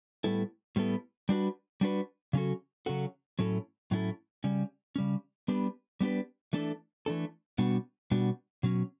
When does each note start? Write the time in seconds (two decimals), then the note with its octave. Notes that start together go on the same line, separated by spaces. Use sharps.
0.24 A2 G3 B3 E4 A4
0.76 A2 G3 B3 E4 A4
1.29 G3 D4 F#4 B4
1.81 G3 D4 F#4 B4
2.33 C#3 F#3 C#4 F#4 A4
2.86 C#3 F#3 C#4 F#4 A4
3.39 A2 F#3 C#4 E4 A4
3.91 A2 F#3 C#4 E4 A4
4.44 C#3 G3 C#4
4.96 C#3 G3 C#4
5.48 G3 B3 D4 G4 B4
6.01 G3 B3 D4 G4 B4
6.53 E3 A3 D4 A4
7.06 E3 A3 D4 A4
7.58 B2 G3 B3 D4 F#4
8.11 B2 G3 B3 D4 F#4
8.63 B2 F#3 C#4